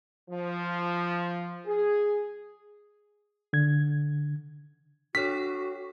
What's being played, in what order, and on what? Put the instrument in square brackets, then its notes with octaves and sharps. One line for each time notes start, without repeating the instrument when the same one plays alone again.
[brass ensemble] F3
G#4
[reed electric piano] D3 G#6
[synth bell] D4 A4 C#5 [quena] F#4 [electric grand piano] B6